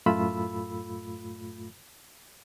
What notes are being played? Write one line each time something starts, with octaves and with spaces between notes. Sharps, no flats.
F#2 A2 A3 F4 B5 E6